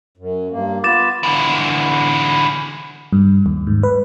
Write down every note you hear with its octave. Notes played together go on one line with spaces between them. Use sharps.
F#2
G2 A#3
B3 F4 B4 D6 A6 E7
D3 E3
G2
D#2
G#2
B4